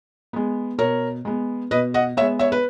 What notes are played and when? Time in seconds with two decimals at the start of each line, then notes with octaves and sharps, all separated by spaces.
0.33 G#3 B3
0.78 B2 A#4 C#5
1.25 G#3 B3
1.71 B2 B4 D#5
1.94 D#5 F#5
2.17 B3 C#5 E5
2.20 G#3
2.39 C#5 E5
2.52 B4